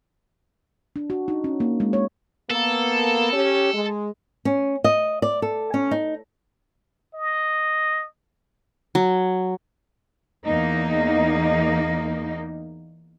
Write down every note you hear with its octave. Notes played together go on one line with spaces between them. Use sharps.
D4
F#4
D#4
C#4
A#3
G#3
C#5
A#3 B3 A4
C#4 G4
G#3
C#4
D#5
D5
A4
C#4
D#4
D#5
F#3
E2 A#3 D#4